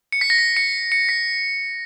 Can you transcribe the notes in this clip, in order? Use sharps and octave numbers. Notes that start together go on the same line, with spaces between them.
C#7
B6
A#6
B6
C#7
C#7
B6